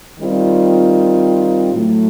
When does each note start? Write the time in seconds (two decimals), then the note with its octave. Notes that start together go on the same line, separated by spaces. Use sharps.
0.19 D#3 G3 C4 F4
1.73 A2 F#3 A3